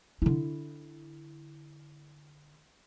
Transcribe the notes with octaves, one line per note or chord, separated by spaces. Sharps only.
D3 E4